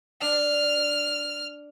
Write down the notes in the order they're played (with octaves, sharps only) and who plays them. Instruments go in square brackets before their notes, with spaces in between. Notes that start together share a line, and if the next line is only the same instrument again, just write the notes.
[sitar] D4 [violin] F6